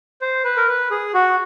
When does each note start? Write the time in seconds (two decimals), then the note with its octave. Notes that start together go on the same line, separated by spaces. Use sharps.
0.22 C5
0.44 B4
0.57 A#4
0.68 B4
0.91 G#4
1.14 F#4